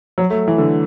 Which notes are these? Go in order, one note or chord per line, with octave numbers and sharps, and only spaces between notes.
F#3
A3
E3
D3